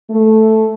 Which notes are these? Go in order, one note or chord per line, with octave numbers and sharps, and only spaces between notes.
A3